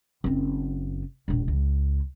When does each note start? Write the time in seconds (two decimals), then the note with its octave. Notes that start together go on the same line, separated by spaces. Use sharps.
0.24 F#1 C4
1.28 E1 A#1
1.48 C#2